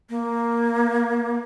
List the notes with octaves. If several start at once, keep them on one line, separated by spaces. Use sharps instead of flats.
A#3